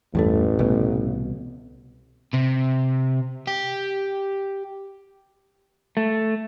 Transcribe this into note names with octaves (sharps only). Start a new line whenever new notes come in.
A1 E2 G2 A3
C2 B2
C3
G4
A3